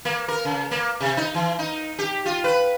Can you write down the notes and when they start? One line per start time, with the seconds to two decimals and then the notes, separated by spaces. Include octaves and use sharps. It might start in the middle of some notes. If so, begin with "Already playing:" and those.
0.05 A#3
0.28 A#4
0.45 C#3
0.71 A#3
1.00 C3
1.17 D#4
1.34 E3
1.59 D#4
1.99 G4
2.26 F4
2.44 B4